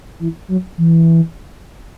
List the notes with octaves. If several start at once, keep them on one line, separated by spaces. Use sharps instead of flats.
E3
F#3
E3